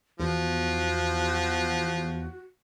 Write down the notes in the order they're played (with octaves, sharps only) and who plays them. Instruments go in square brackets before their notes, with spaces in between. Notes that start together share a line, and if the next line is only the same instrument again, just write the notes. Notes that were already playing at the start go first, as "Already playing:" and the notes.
[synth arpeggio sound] E2 [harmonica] F3 [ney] F#4